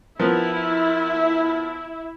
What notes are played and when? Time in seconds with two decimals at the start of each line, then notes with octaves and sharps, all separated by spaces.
0.19 F3 B3 E4 A#4